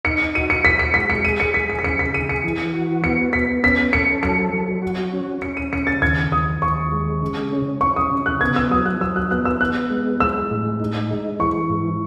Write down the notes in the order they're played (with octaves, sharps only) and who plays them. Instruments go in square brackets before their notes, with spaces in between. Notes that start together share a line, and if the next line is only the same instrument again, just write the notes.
[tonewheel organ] D#4 [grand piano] C#7
[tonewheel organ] F#4 [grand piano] D#7
[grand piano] C#7
[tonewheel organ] F#4 [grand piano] B6
[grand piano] C#7
[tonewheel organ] G#3 [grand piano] B6
[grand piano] C#7
[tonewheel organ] G#4 [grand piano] D#7
[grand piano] C#7
[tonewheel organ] G#4 [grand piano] B6
[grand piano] C#7
B6
[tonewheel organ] C#3 [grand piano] C#7
[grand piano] B6
[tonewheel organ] G#4 [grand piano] D#7
[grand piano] C#7
[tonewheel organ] E3
F#4
[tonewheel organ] B3 [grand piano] C#7
[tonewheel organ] B3 [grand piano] B6
[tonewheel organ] C#4 [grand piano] B6
[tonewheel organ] A4 [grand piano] C#7
[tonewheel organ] F#3 [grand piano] C#7
[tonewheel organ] F#3
F#4
C#4
[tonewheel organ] C#4 [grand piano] C#7
[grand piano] D#7
[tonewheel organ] C#3 [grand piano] C#7
[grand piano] A6
[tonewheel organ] D#2 [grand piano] G#6
[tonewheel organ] D#2 [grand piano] D#6
[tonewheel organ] D#2 [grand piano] C#6
[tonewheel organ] G#3
C#3
C#4
[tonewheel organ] C#4 [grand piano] C#6
[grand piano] D#6
[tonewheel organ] C#3
[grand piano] F#6
[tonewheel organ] B3 [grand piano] G#6
[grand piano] E6
[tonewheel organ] F#3 [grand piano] D#6
[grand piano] F#6
[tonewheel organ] F#3 [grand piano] E6
[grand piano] F#6
[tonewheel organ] B3 [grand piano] F#6
[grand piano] E6
[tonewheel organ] B3 [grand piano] F#6
[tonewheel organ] G#3
[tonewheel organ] G#3 [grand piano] E6
[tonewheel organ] A2
D#4
G#3
[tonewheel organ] E3 [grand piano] C#6
[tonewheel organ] G#2